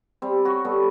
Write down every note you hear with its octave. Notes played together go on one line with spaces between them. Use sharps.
G3 C4
F#4 C#5
G3 B3 A4